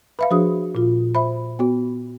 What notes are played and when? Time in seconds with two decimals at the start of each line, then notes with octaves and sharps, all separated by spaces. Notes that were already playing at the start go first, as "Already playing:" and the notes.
0.19 B4 E5 F5 B5
0.31 F3 D4 F#4 G#4 D#6
0.75 A#2 F4
1.15 C5 E5 B5
1.59 B3 F#4